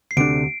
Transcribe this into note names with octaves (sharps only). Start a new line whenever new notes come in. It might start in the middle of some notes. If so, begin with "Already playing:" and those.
C7
D2 C3 A3 D4 D7